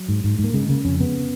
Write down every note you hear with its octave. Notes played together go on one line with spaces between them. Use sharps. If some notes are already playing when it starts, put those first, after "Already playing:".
Already playing: F#3
G#2
G#2
G#2
A#3
C#3 G#3
C#3 A#3
F2 C#4
C#3 B3